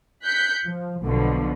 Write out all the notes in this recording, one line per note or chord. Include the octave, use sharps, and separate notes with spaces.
F#6 G6 B6 C#7
F3
B1 B2 D3 F3